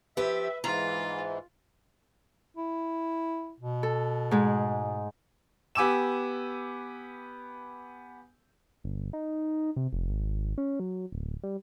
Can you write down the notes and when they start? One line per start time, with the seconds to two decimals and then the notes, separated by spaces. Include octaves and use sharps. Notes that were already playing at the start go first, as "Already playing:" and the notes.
0.17 F3 G4 B4 E5
0.64 G#2 E3 F4 A#5
2.57 E4
3.60 B2
3.83 A4
4.31 G#2 G#3
5.75 B3 G4 G#5 D6 E6 E7
8.84 G1
9.13 D#4
9.76 C3
9.93 F1
10.09 G#1
10.58 C#4
10.80 F#3
11.12 D1
11.43 G3